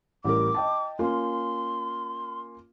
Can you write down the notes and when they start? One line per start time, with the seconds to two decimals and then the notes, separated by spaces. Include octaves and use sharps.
0.24 A1 G3 A#4 D6
0.54 D#5 G5 A5
0.99 A#3 C#4 F4 C6